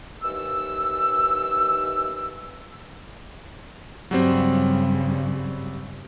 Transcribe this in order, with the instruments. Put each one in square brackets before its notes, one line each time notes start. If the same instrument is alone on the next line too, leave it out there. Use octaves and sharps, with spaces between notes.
[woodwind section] D#2 E3 E6
[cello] G2 C#3 [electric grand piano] F#3 G3 C4